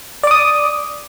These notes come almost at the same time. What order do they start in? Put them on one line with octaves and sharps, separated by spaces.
D5 D6 D#6